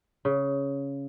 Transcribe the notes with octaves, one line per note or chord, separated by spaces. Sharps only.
C#3